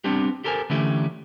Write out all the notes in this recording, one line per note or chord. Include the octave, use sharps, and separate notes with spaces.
G3 B3 C4 D4 G4
G4 A4 A#4 C5 G#5
D3 E3 A3 C#4 E4 G4